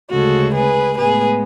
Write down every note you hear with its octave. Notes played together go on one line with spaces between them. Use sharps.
D2 C#3 G#3 F#4 A4
G#4 B4
A2 G#3 B3 G#4 B4